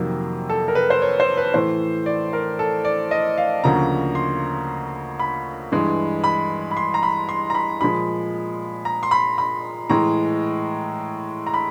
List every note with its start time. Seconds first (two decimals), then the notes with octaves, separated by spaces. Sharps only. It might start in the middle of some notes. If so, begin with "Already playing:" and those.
Already playing: F2 C3 D#3 F#3 A#3
0.50 A4
0.68 A#4
0.75 B4
0.90 C5
1.02 C#5
1.20 C5
1.37 B4
1.54 A2 E3 A3 C5
2.06 D5
2.33 A#4
2.59 A4
2.85 D5
3.11 D#5
3.38 F5
3.63 D2 C#3 F3 A#3 A#5
4.15 C6
5.20 B5
5.72 G2 E3 G#3
6.24 B5
6.71 B5
6.77 C6
6.94 A#5
7.03 B5
7.29 C6
7.50 A#5
7.55 B5
7.81 A#2 F3 G#3 B5
8.85 A#5
9.03 C6
9.11 B5
9.38 B5
9.90 A2 E3 G#3 A#5
11.47 A#5
11.54 B5